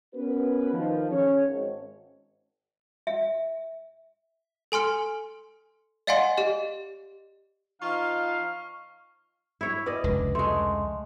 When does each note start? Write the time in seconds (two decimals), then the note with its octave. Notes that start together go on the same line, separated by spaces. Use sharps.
0.13 B3 C#4 F#4 A#4 B4
0.73 D#3 F3
1.11 C#4 G#4 C#5
1.45 G#1
3.07 E5
4.72 A4 G#5 C6 F6 C#7
6.07 D5 D#5 F5 F#5 G#5 C6
6.37 G4 D#5
7.82 F3 D#4 F4 F5 C#6 F6
9.61 E4 C#5
9.86 B4 D5 D#5
10.04 F1 C#2 D3
10.35 G#3 A3 C6